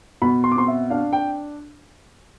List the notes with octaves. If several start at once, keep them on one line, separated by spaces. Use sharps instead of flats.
B2 B5
C6
D6
C4 C6
E5
D4 F5
G5